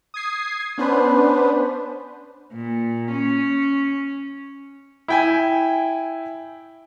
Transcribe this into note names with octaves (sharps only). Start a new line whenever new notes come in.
D#6 G#6 C7
B3 C#4 D4 B4 C5
A#2
C#4
E4 G5 G#5